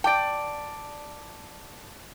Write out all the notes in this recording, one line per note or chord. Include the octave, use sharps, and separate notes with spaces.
D5 G5 A5 D6 D7